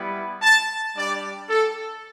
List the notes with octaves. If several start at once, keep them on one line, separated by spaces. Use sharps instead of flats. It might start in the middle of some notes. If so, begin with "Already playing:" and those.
Already playing: G3 B3 E4
A5
G3 D4 G4 D5
A4